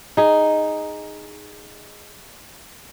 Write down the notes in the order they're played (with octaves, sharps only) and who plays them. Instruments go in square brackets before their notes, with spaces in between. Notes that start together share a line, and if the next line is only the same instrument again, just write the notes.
[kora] D#4 G#4